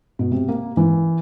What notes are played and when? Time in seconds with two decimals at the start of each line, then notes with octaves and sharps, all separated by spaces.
0.19 B2
0.31 C3
0.49 A#3
0.77 E3